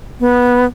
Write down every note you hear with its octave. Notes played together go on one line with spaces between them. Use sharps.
B3